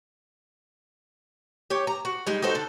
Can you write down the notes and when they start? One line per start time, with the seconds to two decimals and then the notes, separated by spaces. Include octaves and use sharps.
1.70 G4 C#5
1.87 A#5
2.05 F#4
2.27 G3 G#3 D#4
2.42 D#4 F#4 A4 C5
2.55 D3 A4